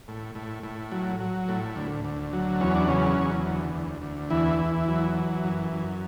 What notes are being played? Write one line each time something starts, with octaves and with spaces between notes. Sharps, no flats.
A2
A2
A2
F#3
F#3
A2
D2
D2
F#3
E2 C#4
D4
C#3 F#3 C#4
E2
D2
D2
D2
E2 E3 E4
E2
F#3
E3
F#2
F#2